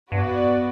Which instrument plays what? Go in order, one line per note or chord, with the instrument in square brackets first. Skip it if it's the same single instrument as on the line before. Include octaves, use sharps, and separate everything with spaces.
[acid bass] G2 [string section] B3 F#4 B4 D5